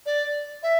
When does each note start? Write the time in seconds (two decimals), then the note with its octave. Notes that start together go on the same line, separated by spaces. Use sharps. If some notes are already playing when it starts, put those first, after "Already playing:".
0.06 D5
0.63 E5